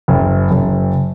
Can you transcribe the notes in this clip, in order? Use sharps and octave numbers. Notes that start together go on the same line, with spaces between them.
F#1
F#1